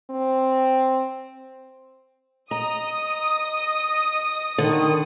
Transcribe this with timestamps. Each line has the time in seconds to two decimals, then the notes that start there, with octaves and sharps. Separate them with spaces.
0.10 C4
2.51 D#5 A#5 D#6
4.58 D3 D#3